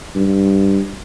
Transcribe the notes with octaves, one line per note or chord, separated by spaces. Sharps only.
G2